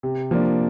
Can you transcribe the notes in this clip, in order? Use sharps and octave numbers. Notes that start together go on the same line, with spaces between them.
C3
F3 A#3 D4